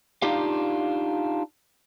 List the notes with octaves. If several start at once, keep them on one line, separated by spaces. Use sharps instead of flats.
D4 D#4 F4 G4 F5